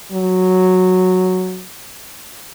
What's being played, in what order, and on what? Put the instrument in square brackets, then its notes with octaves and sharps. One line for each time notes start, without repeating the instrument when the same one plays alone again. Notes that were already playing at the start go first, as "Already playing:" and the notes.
[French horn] F#3